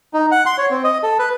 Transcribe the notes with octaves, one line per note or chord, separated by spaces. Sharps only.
D#4
F#5
C6
C#5
C4
D#5
A4
B4